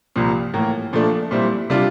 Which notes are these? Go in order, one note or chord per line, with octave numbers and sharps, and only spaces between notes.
C2 A#2 F3
A2 E3 A#3
A#2 F3 A3 D4
A#2 G3 C4 E4
C3 G3 D4 F4